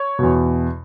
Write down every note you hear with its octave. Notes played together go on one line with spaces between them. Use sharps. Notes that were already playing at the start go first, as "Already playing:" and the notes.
Already playing: C#5
E2 B2